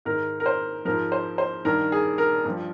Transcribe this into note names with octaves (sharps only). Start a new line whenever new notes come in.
G#2 D#3 A#4
A#4
C5
G#2 F3 A#4
C5
C5
G2 D#3 A#4
G#4
A#4
G2 F3